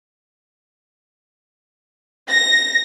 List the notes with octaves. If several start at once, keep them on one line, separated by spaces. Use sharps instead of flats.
A#6